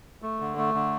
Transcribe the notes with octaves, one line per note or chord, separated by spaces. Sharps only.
A3
D3
A3
D3